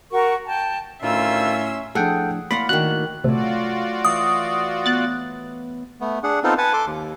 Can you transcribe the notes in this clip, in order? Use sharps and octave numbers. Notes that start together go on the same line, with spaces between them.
F#4 A#4 C#6
G5 A5
D2 A2 D#3 C#4 F4 E5 C6 E6
A2 F3 D4 G#4 A4 F#5 G5
A2 A#3 D5 F5 F#5 B5 C6
D#3 D4 F#4 F#6
A#1 C3 F#3 A3 F4 F#4 D5
E3 C#6 D#6 E6
B3 F#6 A6
A3 B3
D4 G#4 F#5
B3 C4 D#4 F4 A4
B4 F#5 G#5 A5
A4 C6 D6
D#2